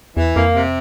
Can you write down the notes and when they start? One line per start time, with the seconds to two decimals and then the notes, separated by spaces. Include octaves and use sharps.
0.17 E2 E3
0.36 F2 A#3
0.55 C3